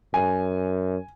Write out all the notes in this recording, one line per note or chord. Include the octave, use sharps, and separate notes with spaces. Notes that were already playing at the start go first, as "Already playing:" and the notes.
F#2 G#5